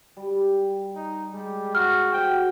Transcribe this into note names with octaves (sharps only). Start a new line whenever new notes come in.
G3
D#4
G3 G#3
F#4 F6
F#4 C5 G5